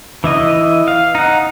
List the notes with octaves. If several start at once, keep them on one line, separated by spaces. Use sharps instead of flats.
E3 E4 D#5
F5
D#4 F#5